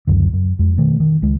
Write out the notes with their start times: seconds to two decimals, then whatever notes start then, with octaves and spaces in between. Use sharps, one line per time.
0.07 C#2 F#2 D3
0.34 F#2
0.59 F2 G#3
0.78 B2 D#3 A3
1.00 D#3
1.22 C#2 G#3